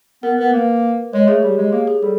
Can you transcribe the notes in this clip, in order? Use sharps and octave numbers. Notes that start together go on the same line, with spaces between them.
B3 A#4
B3 B4
A#3 B4
G#3 C#5
A3 G#4
G3 G4
G#3
A#3 G#4
G#4
G3 A4